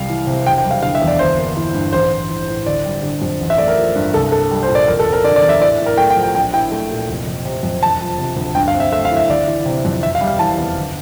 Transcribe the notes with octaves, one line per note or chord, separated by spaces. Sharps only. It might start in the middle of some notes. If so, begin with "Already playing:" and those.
Already playing: C2 G3 F5
E3
C3
E1 G5
G5
G3
F5
D3 F5
E5
E2
D5
G1 C5
A#3
E3
G2
A1 C5
A1
E3
A2
G1 D5
G3
D3
F2
A1
E5
A3 D5
A#4
F3
G2
C2 A4
A#3 A4
G3
C5
A#2
D5
F1 A#4
A4
F1
A#4
D3 D5
D5
E2
E5
A2 D5
A2
A#4
A3 G5
G5
F3
G5
A#1 G5
E4 G5
A3
A#2
F1
F1
C3
F2
E1 A5
F3
C3
D2
G2 G5
F5
C4
E5
A3 E5
F5
E3
E5
G1 D5
E3
C3
F2
E1 E5
F5
G3
F5
E3 A5
E2
G1